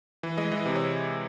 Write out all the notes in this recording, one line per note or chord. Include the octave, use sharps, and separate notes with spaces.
E3
G#3 D#5
E3
C3
C#5